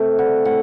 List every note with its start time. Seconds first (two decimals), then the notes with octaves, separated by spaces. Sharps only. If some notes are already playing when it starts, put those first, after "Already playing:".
Already playing: C3 A3
0.19 G3 F#5
0.45 A2 F#5